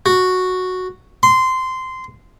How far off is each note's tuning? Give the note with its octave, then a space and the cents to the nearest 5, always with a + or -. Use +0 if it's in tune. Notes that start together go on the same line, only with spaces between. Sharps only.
F#4 -5
C6 -15